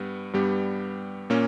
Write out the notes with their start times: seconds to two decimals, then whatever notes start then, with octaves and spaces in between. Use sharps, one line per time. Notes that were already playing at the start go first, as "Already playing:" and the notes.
Already playing: G2 G3 B3
0.33 G2 G3 B3 G4
1.30 A#2 A#3 C#4